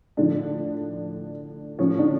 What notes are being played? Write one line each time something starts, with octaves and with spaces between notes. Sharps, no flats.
A2 D3 F3 D4
A2 F3 C#4
D3 D4